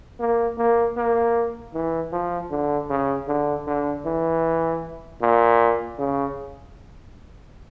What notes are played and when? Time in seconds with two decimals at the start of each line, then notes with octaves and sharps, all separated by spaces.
0.20 A#3
0.59 A#3
0.97 A#3
1.74 E3
2.13 F3
2.51 D3
2.90 C#3
3.28 D3
3.67 D3
4.06 E3
5.22 A#2
5.99 C#3